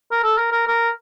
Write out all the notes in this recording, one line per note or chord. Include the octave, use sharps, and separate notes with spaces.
A#4
A4
A#4
A#4
A#4